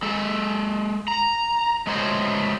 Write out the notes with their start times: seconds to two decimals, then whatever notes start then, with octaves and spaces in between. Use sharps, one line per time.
0.03 G#3 A4
1.08 A#5
1.87 G#3 A3 B3 F#4 C5 C#5